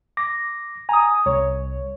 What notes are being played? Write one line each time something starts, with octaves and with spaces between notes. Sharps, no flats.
D6 A#6
G#5 A#5 D#6
C2 C#5